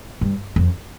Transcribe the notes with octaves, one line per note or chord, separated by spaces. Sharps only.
G2
F2